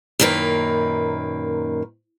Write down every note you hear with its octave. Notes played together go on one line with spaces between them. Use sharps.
F#2 A#2 D#3 A#3 B4